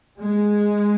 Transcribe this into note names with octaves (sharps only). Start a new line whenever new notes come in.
G#3